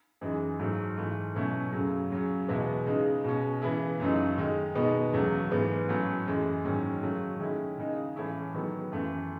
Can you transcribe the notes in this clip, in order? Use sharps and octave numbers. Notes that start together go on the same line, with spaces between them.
F#2 E3 G#3 D#4
G#2 F#3 A3
G#2 E3 A3 E4
B2 F#3 A3 C#4 E4
F#2 C#3 F#3
C#3 F#3 C#4
E2 B2 G#3 B3 E4
C#3 G#3 D#4
B2 G#3 C#4
C#3 E3 B3 E4
F#2 C#3 F#3 A3 D#4
D#3 G#3 D#4
B2 G#3 B3 D#4
E2 C#3 F#3 A3
G#2 E3 B3
A2 F#3 A3 C#4
F#2 E3 G#3
G#2 D#3 F#3 C#4
C#3 F#3 A3
D#3 G#3 C#4 E4
C#3 G#3 D#4
A2 E3 A3 C#4 E4
D#3 F#3 B3
F#2 E3 A3